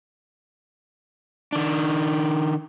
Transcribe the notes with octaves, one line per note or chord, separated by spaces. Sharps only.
D#3 D4